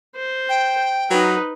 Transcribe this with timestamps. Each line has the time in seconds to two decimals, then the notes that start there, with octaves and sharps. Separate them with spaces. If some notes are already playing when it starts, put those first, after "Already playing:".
0.16 C5
0.49 G5
1.10 F#3 D#4 B4